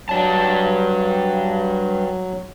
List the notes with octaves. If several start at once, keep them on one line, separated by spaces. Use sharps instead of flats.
G2 F#3 D5 A5